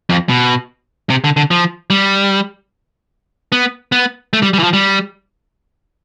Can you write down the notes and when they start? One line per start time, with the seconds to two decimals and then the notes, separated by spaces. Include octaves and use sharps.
0.09 F2
0.29 B2
1.10 C3
1.24 D3
1.37 D3
1.51 F3
1.90 G3
3.52 B3
3.92 B3
4.33 A3
4.42 G3
4.54 G3
4.59 E3
4.63 F3
4.73 G3